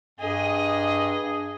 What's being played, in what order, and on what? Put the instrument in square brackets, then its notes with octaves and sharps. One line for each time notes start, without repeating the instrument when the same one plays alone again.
[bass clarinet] G2 [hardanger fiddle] G#4 D#5